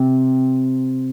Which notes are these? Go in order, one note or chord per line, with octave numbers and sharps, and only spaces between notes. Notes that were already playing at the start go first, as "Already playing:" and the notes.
Already playing: C3 C4